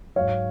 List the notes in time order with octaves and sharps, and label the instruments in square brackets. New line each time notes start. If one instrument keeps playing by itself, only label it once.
[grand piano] G#2 F#3 C#5 F5